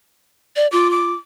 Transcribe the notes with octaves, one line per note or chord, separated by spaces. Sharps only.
D5
F4 D6
D6